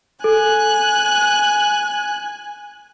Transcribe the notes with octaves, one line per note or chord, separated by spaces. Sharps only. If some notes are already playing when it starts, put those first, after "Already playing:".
A4 G#5 F#6